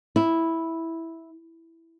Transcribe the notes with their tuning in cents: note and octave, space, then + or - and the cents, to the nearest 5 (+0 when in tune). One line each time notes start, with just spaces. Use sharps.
E4 -5